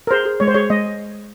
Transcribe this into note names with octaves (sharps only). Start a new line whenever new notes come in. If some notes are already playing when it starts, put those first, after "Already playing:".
A#4
G#4 C5
G#4
G#3 C#5
C5
G#4 C#5
G#3 D#5